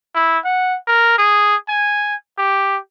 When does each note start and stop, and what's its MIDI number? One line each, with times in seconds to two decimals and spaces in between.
0.15 0.39 64
0.45 0.77 78
0.88 1.14 70
1.18 1.56 68
1.69 2.15 80
2.38 2.78 67